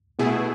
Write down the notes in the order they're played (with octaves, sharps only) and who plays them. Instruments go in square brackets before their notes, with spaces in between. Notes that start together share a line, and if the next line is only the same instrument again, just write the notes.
[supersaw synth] B2 A3 E4 G#4 [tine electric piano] B3